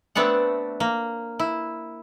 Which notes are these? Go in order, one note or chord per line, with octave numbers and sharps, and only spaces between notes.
A3 B3 C4 D4 F#5
A#3
E4